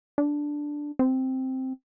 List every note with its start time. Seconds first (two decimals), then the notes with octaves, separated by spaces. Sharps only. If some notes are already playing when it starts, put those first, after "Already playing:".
0.18 D4
0.99 C4